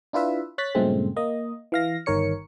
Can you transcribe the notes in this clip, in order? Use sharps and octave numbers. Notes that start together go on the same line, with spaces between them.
D4 E4 F4 B4 E5
C#5 F#6 A6 B6
G2 A#2 C#3 G#3 A3 C4
A#3 D#5
E3 F5 A#6
G1 D#3 A#4 C#5 C#7